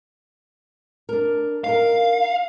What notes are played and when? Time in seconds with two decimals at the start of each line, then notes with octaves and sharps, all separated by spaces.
1.09 D4 A#4
1.64 D#4 A#4 F5